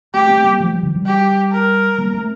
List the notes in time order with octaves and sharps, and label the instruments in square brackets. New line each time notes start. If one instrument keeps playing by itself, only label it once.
[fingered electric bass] A3 C4 [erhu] G4
[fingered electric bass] A3 C4
G3 A#3
F3 A3
E3 G3
D3 F3
E3 G3
[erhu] G4
A#4
[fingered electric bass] G3 A#3
A3 C4